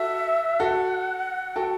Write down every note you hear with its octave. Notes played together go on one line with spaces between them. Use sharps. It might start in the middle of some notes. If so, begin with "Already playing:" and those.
Already playing: F#4 A4 E5
F#4 A4 F#5
F#4 A4 G5